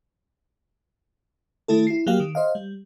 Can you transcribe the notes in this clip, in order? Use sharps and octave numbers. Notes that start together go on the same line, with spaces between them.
D#3 A3 E4 A4
E4 C7
F#3 A#3 G4 F5
D#3
C5 D#5 F5
G3